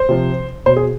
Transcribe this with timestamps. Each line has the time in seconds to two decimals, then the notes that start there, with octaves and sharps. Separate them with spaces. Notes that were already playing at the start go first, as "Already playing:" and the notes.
Already playing: C5
0.09 C3 F3
0.66 B2 C5
0.77 G#4